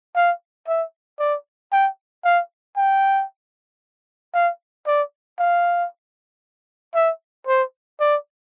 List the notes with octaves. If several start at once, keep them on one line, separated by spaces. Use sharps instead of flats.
F5
E5
D5
G5
F5
G5
F5
D5
F5
E5
C5
D5